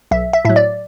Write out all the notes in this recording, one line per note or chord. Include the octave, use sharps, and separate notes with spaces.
B1 E5
E5
A2 F#3 E5
D5